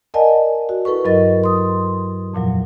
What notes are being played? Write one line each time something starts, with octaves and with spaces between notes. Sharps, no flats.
A#4 D5 D#5 F#5 G#5 A5
F#4
E4 A4 B4 C#6
G2 F#3 A#4 D#5 A6
C6 D#6
F2 A#2 F3 F#3